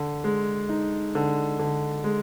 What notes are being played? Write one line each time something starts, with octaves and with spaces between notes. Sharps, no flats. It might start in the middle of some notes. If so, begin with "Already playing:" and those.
Already playing: D3
G#3
D#4
D3
D3
G#3